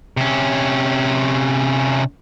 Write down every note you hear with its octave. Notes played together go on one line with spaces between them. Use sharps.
C3 C#4